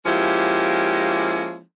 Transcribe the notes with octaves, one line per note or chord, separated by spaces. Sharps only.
F3 G#3 A#3 C#4 E4 G4